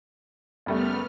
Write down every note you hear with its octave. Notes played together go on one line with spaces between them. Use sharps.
F#1 G3 A3 B3 F6